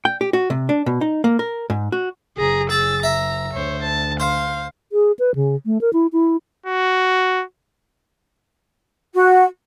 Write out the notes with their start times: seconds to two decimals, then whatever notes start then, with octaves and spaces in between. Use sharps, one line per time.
0.05 G5
0.21 G4
0.33 F#4
0.50 C3
0.69 D4
0.86 B2
1.01 D#4
1.24 A#3
1.39 A#4
1.70 G#2
1.92 F#4
2.37 F#1 G#4 A#5
2.70 G#4 E6 A6
3.03 E5 A#5
3.54 D2 D3 C5 C#5
3.83 A5
4.20 C5 F5
4.92 G#4
5.19 B4
5.35 C#3
5.66 A3
5.81 A#4
5.93 E4
6.13 E4
6.66 F#4
9.14 F#4